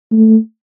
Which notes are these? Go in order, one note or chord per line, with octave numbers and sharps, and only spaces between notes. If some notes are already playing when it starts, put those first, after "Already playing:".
A3